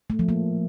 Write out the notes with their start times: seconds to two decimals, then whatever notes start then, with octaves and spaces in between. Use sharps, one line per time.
0.10 A3
0.19 F3
0.29 A#3